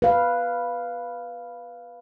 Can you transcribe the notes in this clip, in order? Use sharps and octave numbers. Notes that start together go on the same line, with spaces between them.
B4 F5